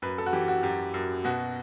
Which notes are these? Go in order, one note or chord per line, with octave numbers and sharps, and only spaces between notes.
F#2 B4
A4
F#4
E3 G4
F#4
F#2 G4
F#2
B2 F#4